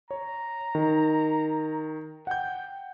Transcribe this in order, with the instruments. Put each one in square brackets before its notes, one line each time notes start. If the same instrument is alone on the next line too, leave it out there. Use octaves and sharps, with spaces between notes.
[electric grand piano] C#5 [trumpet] A#5
[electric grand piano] D#3
[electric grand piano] F#5 G6 [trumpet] G5